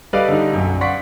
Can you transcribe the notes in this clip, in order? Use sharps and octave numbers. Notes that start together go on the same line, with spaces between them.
G3 A4 B4 D5 D#5 F5
D3 G3 D#4
B1 F#2
D5 F5 F#5 C6 C#6 B6